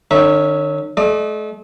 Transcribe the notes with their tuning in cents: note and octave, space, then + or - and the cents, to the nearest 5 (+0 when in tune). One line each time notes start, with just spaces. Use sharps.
D#3 -45 C#4 +0 E5 -25
A3 -40 D5 +45